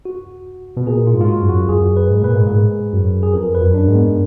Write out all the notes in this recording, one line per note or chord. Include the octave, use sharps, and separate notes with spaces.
F#4
B2
A#2 G#4
F4
G#2
F4
F#4
F#2
F#4
F#2 G#4
B4
G#2
A#2 B4
G#2
A#2
G#2
F#2
G#4
F2 A#4
B4
F#2
D4
G#2
B3